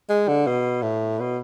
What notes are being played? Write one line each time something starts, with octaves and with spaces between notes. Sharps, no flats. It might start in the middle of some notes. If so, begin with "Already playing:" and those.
G#3
D3
B2
A2
B2